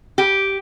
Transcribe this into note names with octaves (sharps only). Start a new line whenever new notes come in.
G4